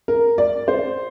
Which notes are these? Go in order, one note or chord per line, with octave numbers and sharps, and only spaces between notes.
A#4
D5
C5